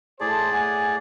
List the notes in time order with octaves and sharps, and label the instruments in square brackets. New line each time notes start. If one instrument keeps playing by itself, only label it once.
[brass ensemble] A2 C5 A5 [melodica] G#4 D5
[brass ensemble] A2 F#5 G#5